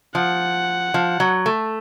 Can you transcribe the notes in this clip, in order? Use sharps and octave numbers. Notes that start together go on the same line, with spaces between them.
F3 F#5
F3
F#3
A3